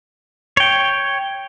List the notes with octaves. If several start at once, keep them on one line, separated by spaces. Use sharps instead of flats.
C#5 G5